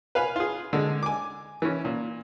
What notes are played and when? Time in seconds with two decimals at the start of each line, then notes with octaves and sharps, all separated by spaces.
0.15 B4 F5 G#5 B5
0.36 F4 G#4
0.73 D3 G#3
1.03 G#5 D6
1.62 E3 C#4
1.85 A#2